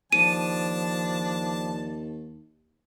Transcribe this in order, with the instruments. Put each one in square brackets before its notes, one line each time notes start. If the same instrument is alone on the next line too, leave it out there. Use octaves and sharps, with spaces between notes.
[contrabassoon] D#2 [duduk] F3 [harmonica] D4 A5 [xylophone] D#7